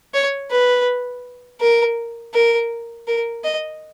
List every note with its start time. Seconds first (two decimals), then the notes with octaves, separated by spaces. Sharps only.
0.14 C#5
0.51 B4
1.61 A#4
2.34 A#4
3.07 A#4
3.44 D#5